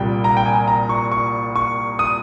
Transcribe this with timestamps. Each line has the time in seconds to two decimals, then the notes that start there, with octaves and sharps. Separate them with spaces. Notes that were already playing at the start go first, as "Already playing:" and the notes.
Already playing: C2 A#2 G3 G5
0.24 A#5
0.37 G5
0.46 G#5
0.68 A#5
0.89 C#6
1.12 C#6
1.56 C#6
1.99 D#6